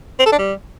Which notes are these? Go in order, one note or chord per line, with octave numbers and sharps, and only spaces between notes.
C4
A4
D4
G3